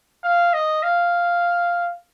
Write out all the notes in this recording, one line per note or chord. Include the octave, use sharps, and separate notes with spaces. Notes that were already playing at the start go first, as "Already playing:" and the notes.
F5
D#5
F5